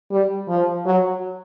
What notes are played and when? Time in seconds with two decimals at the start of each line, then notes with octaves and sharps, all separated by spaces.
0.11 G3
0.48 F3
0.86 F#3